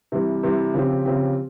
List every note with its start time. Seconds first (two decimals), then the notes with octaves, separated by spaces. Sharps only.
0.12 C3 E3 G3
0.43 C3 E3 G3
0.74 C#3 F3 C4 G4
1.05 C#3 F3 C4 G4